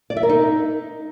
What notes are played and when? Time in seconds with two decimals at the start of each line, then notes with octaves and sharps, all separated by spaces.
0.10 D5
0.17 E5
0.23 A#4
0.29 D#4